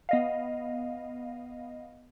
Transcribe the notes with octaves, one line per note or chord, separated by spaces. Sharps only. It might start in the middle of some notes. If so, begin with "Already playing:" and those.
B3 D#5 F5